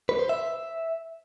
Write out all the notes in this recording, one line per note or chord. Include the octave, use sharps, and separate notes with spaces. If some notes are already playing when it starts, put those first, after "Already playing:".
B4
C5
E5